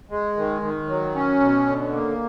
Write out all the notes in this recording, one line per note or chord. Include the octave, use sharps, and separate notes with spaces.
G#3
D#3
D#3
F#3
C#4
B2
D3
A#3